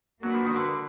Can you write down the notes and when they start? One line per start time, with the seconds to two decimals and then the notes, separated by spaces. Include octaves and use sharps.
0.22 F#3 A#3 D4 F#4 B4
0.34 F3
0.45 D#3
0.56 D3